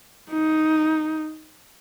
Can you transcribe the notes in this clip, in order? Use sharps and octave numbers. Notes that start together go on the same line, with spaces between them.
D#4